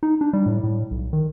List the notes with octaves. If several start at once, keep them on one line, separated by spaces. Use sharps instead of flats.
D#4
D4
G3
A2
A2
B1
D#3